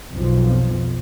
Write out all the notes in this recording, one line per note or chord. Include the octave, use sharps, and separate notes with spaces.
B1 F2 F3